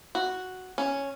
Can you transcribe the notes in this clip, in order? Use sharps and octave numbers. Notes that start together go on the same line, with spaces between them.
F#4
C#4